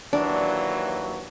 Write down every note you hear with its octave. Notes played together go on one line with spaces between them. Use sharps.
D#2 E3 F#3 D4